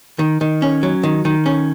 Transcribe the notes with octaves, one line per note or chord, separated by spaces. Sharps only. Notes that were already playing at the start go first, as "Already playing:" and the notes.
D#3
D#3
C#4
F#3
D#3
D#3
C#4